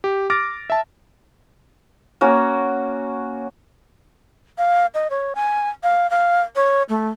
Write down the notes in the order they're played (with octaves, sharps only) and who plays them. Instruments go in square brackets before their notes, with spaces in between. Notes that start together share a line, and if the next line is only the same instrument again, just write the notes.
[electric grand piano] G4
D6 F6 A6 A#6 D7
E5 A5
[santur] A#3 C#4 F#4
[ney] F5
D#5
C#5
G#5
F5
F5
C#5
A3